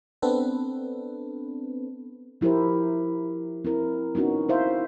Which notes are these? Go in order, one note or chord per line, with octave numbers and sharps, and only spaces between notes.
B3 C4 D4 A4 B4
F3 E4 G4 A#4 C5
C4 E4 A#4
B3 C#4 D#4 F#4 A#4
E4 C5 E5 F5